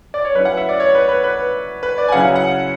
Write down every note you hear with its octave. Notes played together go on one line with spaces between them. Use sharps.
D5
C#5
F#3 C#4 E4 B4
F#5
E5
D5
C#5
B4
B4
B4
B4
D5
G#5
C#3 F#3 C#4 E4 F#5
F#5